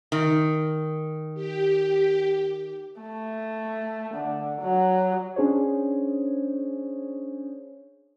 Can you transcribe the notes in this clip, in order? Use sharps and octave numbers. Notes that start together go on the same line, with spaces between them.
D#3
G4
A3
D3
F#3
C#4 D4 G#4 C5 C#5